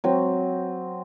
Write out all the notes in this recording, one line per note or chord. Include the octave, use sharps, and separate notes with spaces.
F#3 C4